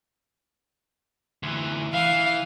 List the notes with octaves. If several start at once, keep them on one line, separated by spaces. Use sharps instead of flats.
D2 E3
E3 F5